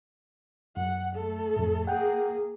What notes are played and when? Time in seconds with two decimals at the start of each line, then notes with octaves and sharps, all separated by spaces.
0.77 F#2 F#5
1.16 A3 A4
1.56 F2 A2
1.87 A#3 G#4 F#5 G5